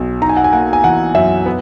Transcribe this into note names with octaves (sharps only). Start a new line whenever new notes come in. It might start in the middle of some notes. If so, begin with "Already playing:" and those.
Already playing: B1
D#4 A#5
G#5
F#5
G#5
A#3 F#5
G#5
E3 F#5
F#2 E5
B3